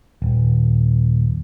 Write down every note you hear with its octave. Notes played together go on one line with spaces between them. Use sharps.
D#1